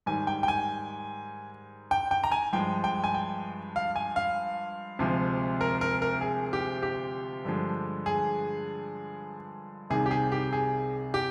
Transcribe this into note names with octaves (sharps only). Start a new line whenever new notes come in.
G#2 D#3 G3 G#5
G5
G5
G#5
G5
G5
A#5
G#5
G2 F3 G#3 G5
G5
G#5
G5
F5
G#5
F5
D2 C3 F3 G#3
A#4
A#4
A#4
G#4
G4
G4
G2 D3 F3 G#3
G#4
C2 C3 D#3 G#4
G4
G#4
G4
G#4
G4